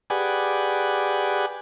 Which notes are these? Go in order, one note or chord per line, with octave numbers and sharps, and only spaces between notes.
G4 G#4 B4 D5 F#5 G#5